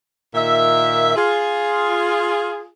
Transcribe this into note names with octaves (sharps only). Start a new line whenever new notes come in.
A#2 D#3 E5
F4 G#4